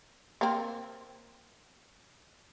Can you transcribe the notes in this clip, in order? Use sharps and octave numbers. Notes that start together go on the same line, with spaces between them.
A#3 C4